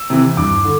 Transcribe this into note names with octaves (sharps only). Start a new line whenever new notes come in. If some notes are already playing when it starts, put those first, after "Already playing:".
Already playing: E6
C3 E3
G2 D6
D3